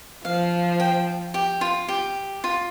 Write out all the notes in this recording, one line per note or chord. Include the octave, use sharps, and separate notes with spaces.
F3 F5
G5
G4
F4
G4
F4